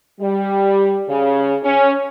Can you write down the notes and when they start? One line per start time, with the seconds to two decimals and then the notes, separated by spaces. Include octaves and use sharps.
0.21 G3
1.09 C#3
1.64 C#4